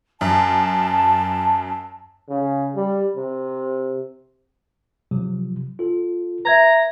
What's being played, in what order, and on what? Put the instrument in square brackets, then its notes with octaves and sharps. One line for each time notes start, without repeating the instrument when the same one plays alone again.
[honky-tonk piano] F#2 [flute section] A5
[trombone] C#3
G3
C3
[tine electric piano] C3 F3 F#3
F4 A4
[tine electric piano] B4 [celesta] E5 G#6 A#6 [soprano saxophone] A#5